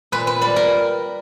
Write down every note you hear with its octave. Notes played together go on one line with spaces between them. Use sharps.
A#2 B4
B4
G3 B4
A#4